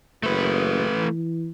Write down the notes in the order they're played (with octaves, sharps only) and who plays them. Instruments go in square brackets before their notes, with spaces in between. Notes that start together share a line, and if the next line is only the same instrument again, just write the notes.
[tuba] F#1 [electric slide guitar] A3 B4
[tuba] E3